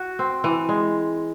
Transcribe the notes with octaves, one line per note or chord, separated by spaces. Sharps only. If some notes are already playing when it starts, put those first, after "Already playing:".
Already playing: F#4
C4
E3
G#3